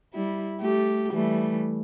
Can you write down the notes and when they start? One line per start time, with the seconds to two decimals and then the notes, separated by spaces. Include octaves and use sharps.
0.14 G3 E4
0.60 A3 G4
1.12 E3 G3 A3